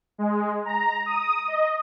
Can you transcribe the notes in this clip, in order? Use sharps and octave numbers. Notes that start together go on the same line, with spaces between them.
G#3
A#5
D#6
D#5